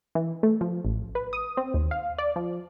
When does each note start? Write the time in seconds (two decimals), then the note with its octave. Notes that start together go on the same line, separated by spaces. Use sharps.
0.15 E3
0.43 A3
0.61 F3
0.85 A1
1.15 B4
1.33 D#6
1.57 C4
1.74 D#2
1.91 F5
2.18 D5
2.36 F3